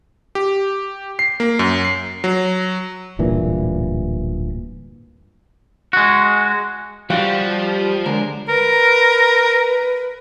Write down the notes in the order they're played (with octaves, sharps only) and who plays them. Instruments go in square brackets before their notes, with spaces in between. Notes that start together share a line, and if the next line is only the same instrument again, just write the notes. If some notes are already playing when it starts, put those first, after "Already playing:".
[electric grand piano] G4
C7
A#3
F#2
C7
F#3
[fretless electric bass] D1 G2 A#2 E3
[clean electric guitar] G#3 F#4
[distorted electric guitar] F3 [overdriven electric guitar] G3 [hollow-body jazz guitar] F#4 G4 F5
[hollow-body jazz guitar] D3 G#3 [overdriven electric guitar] A#4
[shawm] A#4 [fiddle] B4